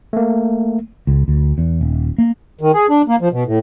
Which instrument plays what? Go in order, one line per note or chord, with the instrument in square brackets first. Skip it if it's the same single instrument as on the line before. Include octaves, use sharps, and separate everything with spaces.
[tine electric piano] A3 A#3
[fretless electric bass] C#2
D2
E2
D#1
A#3
[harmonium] D#3
G#4
D4
A#3
F3
B2
A2